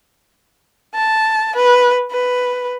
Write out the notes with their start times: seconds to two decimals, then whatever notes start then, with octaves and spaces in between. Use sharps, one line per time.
0.95 A5
1.56 B4
2.11 B4